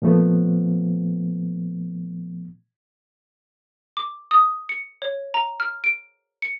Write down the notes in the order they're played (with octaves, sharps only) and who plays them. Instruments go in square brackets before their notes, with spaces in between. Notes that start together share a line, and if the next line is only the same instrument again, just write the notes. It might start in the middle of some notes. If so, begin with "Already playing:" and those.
[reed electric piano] A#2 F3 A3 B3
[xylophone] D6
D#6
C#7
C#5
A#5
F6
D7
C#7